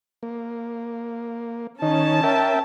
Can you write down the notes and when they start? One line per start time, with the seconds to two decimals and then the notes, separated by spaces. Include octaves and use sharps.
0.23 A#3
1.82 D#3 C#4 D#4 A5
2.23 A#4 E5 G5